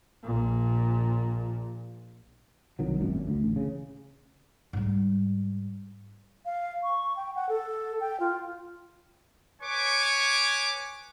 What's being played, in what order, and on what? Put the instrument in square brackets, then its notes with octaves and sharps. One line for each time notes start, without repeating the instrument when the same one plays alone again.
[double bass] A#1 A#2
[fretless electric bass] C2 D#3 F#3
G#1 F#2 A#2
D2
A1
C#3
[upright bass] G#2 G3
[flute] F5
C#6
G5
F#5
A4
G5
F4
[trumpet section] B4 C#5 G#5 C#6 D6